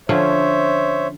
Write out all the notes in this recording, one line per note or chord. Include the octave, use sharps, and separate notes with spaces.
D3 F3 C#4 C5 C#5 E5